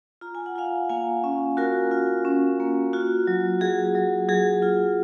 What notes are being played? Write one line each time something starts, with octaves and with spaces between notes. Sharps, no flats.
F4 A#5
G#5
F#5
F4 F5 G#5
A#3 F5 G#5
C#4
F4 F#4 A#4
F4
C#4
A#3
F4 F#4
F#3
F#3 G#4
F#3
F#3 G#4
F4